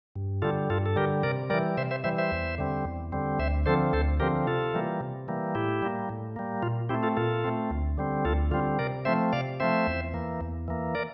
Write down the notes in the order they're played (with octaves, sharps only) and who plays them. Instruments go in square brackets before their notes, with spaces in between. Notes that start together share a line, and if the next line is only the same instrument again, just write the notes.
[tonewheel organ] G2
D3 G3 F4 A4
G2 F4 A4
A4
D3 G3 G4 A#4
C3 A#4 D5
G3 A#4 D5
E3
C3 C5 E5
C5 E5
E3 G3 C5 E5
C5 E5
E2
D3 G3 C4
E2
D3 G3 C4
D2 C5 E5
D3 F3 C4 A4 C5
D2 A4 C5
D3 F3 C4 G4 A#4
C3 F4 A4
E3 G3 A#3
C3
E3 G3 A#3
A2 E4 G4
G3 A#3
A2
G3 A#3
A#2 F4
C4 E4 G4
A3
F4 A4
A#2 F4 A4
A3 C4
D2
D3 G3 C4
D2 F4 A4
D3 G3 C4 F4
C3 A#4 D5
F3 A3 C4 C5 E5
C3 D5 F5
F3 A3 C4 C5 E5
E2
E3 A#3
E2
E3 A#3
A#4 D5